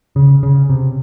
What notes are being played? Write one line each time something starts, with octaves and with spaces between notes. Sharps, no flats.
C#3
C#3
C3